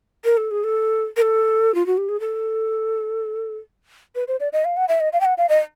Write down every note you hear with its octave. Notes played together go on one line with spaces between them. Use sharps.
A#4
A4
G#4
A4
A#4
A4
F4
F#4
G4
G#4
A4
B4
C5
D5
D#5
F5
F#5
E5
D#5
F5
G5
F#5
F5
D#5